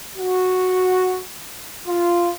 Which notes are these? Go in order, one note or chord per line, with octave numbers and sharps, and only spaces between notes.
F#4
F4